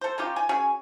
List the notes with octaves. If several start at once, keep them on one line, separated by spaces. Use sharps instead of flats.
A4 C5
C#4 D#4 F4 G4
G#5
C#4 F#4 G#4 G#5